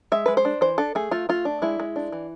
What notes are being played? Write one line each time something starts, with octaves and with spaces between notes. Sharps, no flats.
G#3 E5
G#3 B4
C5
D4
E3 C5
D4 A4
A3 G#4
A3 F4
A3 F4
D4
G#3 E4
G#3
D4
E3